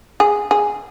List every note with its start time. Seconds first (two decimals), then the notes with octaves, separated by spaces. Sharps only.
0.20 G#4
0.51 G#4